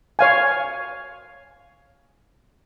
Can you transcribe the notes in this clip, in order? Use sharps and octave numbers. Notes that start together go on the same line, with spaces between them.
C#5 F5 G#5